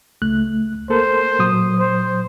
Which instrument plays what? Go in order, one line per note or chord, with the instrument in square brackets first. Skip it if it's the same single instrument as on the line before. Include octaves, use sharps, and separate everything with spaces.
[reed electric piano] C#2 A3 F#6
[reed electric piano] A#3 A4 A#4 [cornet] C5
[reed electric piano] A#2 F#3 D#6
[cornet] C5